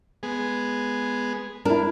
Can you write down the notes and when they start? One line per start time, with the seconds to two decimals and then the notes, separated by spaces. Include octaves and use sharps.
0.23 G#3 B3 G#4
1.65 D4 E4 A#4